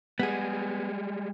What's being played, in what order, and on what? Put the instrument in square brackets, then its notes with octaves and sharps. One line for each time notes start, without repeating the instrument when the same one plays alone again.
[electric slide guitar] G3 G#3 [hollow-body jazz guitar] B3 G#4